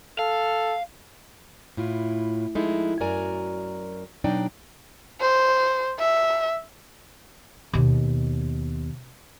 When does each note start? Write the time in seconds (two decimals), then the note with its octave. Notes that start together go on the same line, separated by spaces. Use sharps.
0.19 A4 F5
1.77 A2 E4 F4
2.55 F3 G#3 D#4 E4 A4
3.00 F#2 F#4 A#4 D5 G#5 A#5
4.24 B2 F#3 D4 D#4 D5 G5
5.20 C5
5.99 E5
7.73 D#2 B2